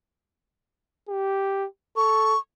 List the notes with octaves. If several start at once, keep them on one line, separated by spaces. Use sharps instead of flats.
G4
A4 C#6